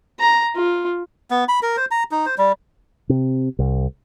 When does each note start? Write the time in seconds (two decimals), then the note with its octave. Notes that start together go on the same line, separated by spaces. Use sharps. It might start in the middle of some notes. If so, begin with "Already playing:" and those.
0.19 A#5
0.56 F4
1.31 B3
1.48 B5
1.62 A#4
1.77 C5
1.91 A#5
2.11 D#4
2.26 C5
2.38 G3
3.09 C3
3.59 C2